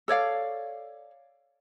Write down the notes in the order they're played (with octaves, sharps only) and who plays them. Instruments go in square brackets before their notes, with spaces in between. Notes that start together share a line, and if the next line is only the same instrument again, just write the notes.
[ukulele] A4 C#5 D5 F5